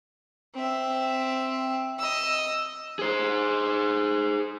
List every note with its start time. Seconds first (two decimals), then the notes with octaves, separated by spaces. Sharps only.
0.54 C4 E5
1.99 D#5 E6
2.99 G#4 C5